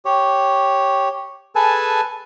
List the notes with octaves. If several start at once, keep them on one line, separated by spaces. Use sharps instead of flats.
G4 C#5
G#4 A4 B4 G#5 A5